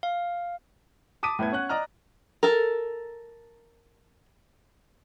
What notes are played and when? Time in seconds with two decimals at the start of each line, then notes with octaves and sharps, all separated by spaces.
0.03 F5
1.23 A5 D6 D#6 B6 D#7
1.39 A2 A3 B3 G#6
1.52 C#4 F#5 F#6
1.69 D5 D#5 A#5 F6
2.43 A4 A#4